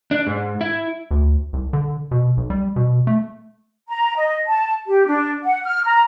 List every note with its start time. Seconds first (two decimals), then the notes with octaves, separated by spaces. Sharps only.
0.11 D4
0.27 G#2
0.61 E4
1.11 D2
1.53 C2
1.73 D3
2.11 B2
2.37 B1
2.50 G3
2.76 B2
3.07 A3
3.89 A#5
4.16 D#5
4.46 A5
4.86 G4
5.06 D4
5.43 F#5
5.64 F6
5.84 A#5